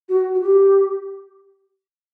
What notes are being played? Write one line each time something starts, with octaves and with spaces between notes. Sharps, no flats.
F#4
F#4
G4